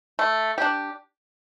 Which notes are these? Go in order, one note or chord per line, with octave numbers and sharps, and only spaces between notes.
A3
D4 G4